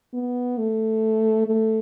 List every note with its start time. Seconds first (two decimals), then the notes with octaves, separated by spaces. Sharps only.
0.14 B3
0.58 A3
1.46 A3